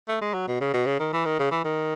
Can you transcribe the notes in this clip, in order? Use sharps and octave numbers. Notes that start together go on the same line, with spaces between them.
A3
G#3
F#3
B2
C#3
B2
C#3
D#3
E3
D#3
C#3
E3
D#3